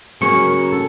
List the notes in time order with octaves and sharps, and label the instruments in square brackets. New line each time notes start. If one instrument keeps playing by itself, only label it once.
[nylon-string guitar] C#3 F#3 A#3 C#4 F#4 [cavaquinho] C#6
[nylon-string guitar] A4